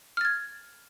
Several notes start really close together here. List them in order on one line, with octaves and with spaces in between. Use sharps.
F6 A6 G#6